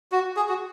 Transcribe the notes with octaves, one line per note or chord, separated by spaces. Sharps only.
F#4
G#4
F#4